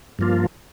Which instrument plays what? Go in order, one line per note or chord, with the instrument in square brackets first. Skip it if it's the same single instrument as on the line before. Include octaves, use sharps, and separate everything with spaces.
[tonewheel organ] G2 F3 A#3 F4